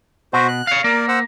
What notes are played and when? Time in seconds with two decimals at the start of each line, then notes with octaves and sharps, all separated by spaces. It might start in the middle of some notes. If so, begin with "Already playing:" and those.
0.33 B2 F#4 C5
0.48 F#6
0.67 C#5 F5
0.84 A#3 A#4 D5
1.08 C5 F#5 E6